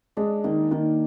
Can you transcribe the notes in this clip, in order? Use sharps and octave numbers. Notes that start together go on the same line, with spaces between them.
G#3 D4
D#3 A#3
D#3 A#3